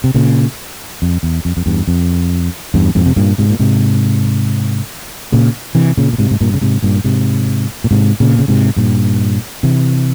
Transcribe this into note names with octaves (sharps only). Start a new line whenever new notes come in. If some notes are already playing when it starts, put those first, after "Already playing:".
C3
A#2 C#3
F2
E2
F2
F2
E2 G2
F2
E2 G2
F2 G#2
C3
G2 A#2
G#2 C3
A#2
G#2 C3
A#2 C#3
C3 E3
A#2 C#3
A#2
G#2 C3
G#2
G2 A#2
C#3
G#2 C3
G2 A#2
G#2 C3
A#2
G#2 C3
A#2 C#3
C#3
G#2 C3
G2 A#2
C3 E3